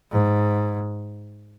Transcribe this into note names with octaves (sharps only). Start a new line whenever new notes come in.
G#2